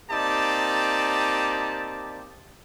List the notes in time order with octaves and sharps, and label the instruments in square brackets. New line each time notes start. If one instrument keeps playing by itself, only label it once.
[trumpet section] A#3 C4 D#4 G4 D5 A5